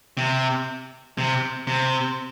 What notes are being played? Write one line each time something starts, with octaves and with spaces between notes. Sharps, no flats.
C3
C3
C3